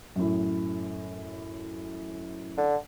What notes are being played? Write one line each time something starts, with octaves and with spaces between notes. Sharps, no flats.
F#2 A2
D3